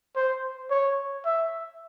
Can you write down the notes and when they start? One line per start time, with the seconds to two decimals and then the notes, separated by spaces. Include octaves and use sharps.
0.16 C5
0.71 C#5
1.25 E5